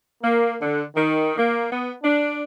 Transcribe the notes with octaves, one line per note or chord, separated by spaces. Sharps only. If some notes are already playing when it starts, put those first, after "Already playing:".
A#3
D3
D#3
A#3
B3
D4